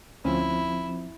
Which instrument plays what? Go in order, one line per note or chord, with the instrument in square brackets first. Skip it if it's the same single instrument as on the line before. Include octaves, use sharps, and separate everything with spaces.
[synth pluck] D2 C#4 [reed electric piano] F3 C4 [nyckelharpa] E4